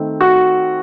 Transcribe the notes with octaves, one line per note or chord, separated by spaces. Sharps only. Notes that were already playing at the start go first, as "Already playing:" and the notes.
Already playing: D#3 A3 C4
F#4